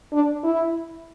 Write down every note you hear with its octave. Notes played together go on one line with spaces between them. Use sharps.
D4
E4